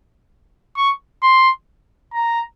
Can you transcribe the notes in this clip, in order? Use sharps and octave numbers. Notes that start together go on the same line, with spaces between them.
C#6
C6
A#5